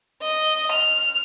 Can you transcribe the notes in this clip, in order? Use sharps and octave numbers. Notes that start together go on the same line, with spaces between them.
D#5
F6